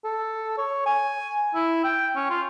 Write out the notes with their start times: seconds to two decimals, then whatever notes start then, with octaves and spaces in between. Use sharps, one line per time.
0.04 A4
0.58 C#5
0.86 G#5
1.54 E4
1.84 G5
2.16 C#4
2.30 F4